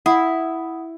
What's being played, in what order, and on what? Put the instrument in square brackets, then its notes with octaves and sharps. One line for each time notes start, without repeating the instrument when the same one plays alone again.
[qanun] E4 [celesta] F#5 D#6